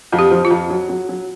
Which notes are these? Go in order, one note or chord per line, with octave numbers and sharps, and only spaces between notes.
F2
G4
F3
F4
F2
F#3
F#3
F#3